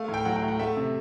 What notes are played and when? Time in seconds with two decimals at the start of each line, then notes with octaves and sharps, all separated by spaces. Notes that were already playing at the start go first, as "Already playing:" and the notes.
Already playing: A3 F5
0.08 A2
0.14 G5
0.25 F#3 F#5
0.36 G5
0.42 A2
0.48 F#5
0.59 A3 E5
0.77 C3